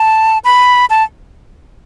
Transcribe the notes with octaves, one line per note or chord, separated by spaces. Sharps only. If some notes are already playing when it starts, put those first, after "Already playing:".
Already playing: A5
B5
A5